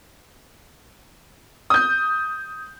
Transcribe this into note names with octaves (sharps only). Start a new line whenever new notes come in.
D#6 G6